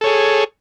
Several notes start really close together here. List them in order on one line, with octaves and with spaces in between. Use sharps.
A4 C#5 G#4